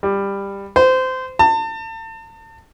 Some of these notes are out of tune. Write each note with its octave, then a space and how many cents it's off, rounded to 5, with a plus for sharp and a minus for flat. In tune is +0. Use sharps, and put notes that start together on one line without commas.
G3 +15
C5 -20
A5 +35